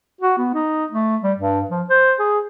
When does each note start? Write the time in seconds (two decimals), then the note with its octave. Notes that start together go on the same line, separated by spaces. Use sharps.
0.21 F#4
0.38 B3
0.54 D#4
0.92 A3
1.23 G3
1.38 G2
1.70 F3
1.89 C5
2.19 G#4